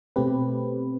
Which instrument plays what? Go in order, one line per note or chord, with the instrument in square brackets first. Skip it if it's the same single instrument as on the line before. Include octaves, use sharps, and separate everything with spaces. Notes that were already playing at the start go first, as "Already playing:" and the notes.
[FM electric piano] B2 A3 C4 G4 B4